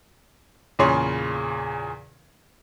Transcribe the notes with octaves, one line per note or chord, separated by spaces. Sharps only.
E2 A#2 C#3 G#4 C#5 C6